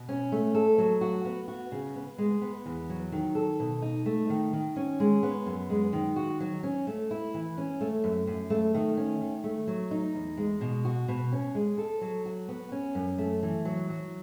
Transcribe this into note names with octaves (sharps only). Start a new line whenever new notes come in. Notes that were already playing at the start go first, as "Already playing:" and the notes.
Already playing: B2
C#4
A3
A4
F#3
F#4
B3
F#4
C#3
B3
G#3
B3
E2
F#3
D#3
A4
B2
D#4
A3
D#3
D#3
C#4
G#3
B3
F#2
G#3
D#3
F#4
F#3
C#4
A3
E4
E3
C#4
A3
F#2
F#2
A3
D#3
C#4
D#3
A3
F#3
D#4
E2
G#3
B2
F#4
B2
C#4
G#3
A4
F#3
F#4
B3
C#4
F#2
A3
E3
F#3
F#3